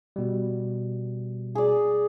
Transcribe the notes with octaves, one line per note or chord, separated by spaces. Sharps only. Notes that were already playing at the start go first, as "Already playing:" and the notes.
B2 G3
G#4 D5